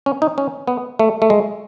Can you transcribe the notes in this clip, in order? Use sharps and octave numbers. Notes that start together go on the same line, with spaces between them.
C#4
D#4
C#4
B3
A3
A3
G#3